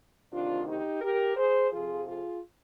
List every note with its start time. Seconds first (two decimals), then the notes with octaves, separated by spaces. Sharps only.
0.31 D2 C3 D#3 D4 F4
0.66 D#4 G4
1.01 G4 A#4
1.36 G#4 C5
1.72 F2 C3 F3 F4 G#4
2.07 F4 G#4